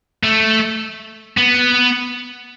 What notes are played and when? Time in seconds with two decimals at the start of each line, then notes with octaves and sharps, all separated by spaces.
0.24 A3
1.38 B3